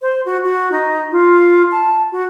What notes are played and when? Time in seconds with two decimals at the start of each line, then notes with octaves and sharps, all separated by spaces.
0.02 C5
0.25 F#4
0.44 F#4
0.72 D#4
1.12 F4
1.72 A5
2.12 F#4